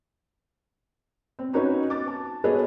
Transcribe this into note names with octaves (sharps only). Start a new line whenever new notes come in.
C4
C#4 D#4 F#4 B4 C#5
D6 A6
A5
F#4 G#4 A4 B4 C#5 D#5